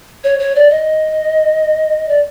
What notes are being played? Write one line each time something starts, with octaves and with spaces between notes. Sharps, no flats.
C#5
C#5
D5
D#5
D5